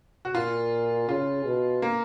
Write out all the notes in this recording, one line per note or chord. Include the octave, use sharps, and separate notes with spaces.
F#4
A#2 F4
C#3 F4
B2
A#3